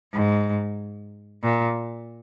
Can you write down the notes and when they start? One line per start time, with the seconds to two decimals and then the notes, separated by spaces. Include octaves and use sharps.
0.13 G#2
1.43 A#2